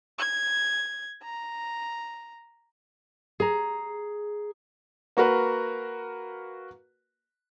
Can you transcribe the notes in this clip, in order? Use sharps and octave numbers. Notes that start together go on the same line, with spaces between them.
G#6
A#5
G#4 A#5
A#3 F#4 A#4 B4